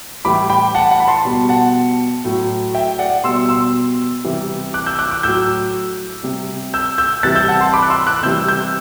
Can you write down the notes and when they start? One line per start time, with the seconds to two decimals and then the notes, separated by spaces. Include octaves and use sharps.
0.25 A2 E3 G3 B5 D6
0.50 G5 B5
0.75 F#5 A5
0.91 F#5 A5
1.00 B5
1.08 A5 C6
1.25 B2 G3
1.49 F#5 A5
2.25 A2 F#3
2.75 E5 G5
2.99 D5 F#5
3.24 B2 G3 C6 E6
3.49 C6 E6
4.25 C3 E3 G3
4.74 D6 F#6
4.86 E6 G6
4.99 D6 F#6
5.11 D6 F#6
5.23 A2 F#3 E6 G6
6.23 C3 G3
6.74 E6 G6
6.98 E6 G6
7.23 C3 E3 G3 F#6 A6
7.36 E6 G6
7.48 F#5 A5
7.60 A5 C6
7.73 B5 D6
7.82 F#6
7.90 C6 E6
8.07 D6 F#6
8.19 F#6
8.23 C3 E3 G3 E6 G6
8.48 E6 G6